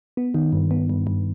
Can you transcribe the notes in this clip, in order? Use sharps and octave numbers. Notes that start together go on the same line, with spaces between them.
B3
D#3
G2
B3
G2
G2